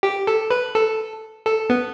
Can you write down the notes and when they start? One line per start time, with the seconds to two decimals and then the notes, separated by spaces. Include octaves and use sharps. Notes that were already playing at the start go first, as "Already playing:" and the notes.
0.03 G4
0.27 A4
0.51 B4
0.75 A4
1.46 A4
1.70 B3